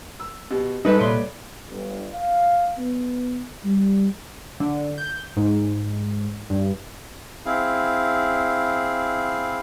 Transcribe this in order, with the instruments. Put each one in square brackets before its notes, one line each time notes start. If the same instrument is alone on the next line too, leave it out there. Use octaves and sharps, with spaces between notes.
[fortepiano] E6
[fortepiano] B2 [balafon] G4
[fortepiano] G#2 [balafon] G3 [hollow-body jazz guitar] D#4 [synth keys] A4 B4 D#5
[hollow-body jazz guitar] C2 A#2 C6 [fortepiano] C#5 D5 [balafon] E5
[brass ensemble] G1
F5
B3
G3
[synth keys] D3
G6
G#2
G2
[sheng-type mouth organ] C4 E4 G#4 F5